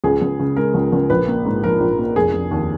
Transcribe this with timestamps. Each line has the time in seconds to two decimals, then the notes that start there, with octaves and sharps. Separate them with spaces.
0.04 C#2 G#4
0.22 C#2
0.40 C#3
0.56 G#3 A#4
0.74 C#2
0.92 C#2
1.10 A#1 B4
1.28 A#3
1.45 G#2
1.63 F3 A#4
1.80 A#1
1.98 A#3
2.16 F1 G#4
2.34 F1
2.51 D#2